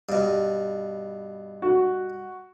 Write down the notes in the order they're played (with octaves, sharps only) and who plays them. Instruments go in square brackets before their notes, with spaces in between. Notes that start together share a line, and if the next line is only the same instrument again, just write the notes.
[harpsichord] G2 B2
[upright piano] F#4